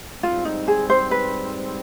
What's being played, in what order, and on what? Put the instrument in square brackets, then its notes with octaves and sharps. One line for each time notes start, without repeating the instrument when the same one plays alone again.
[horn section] G#2 G3 C4 [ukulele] F4
[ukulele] D#4
G#4
C5
B4